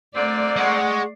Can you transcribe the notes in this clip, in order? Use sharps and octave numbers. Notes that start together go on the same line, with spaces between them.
A#2 D3 A3 C4 D5
G#3 F#5 C#6